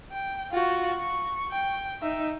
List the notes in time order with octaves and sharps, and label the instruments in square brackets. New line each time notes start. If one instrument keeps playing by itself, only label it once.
[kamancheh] G5
F4 F#4
C#6
G5
D#4 E5